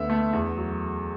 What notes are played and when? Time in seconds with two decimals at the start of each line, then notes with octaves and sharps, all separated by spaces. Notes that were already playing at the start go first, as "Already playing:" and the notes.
Already playing: D2 B3 E5
0.10 A3
0.33 E2
0.57 F#3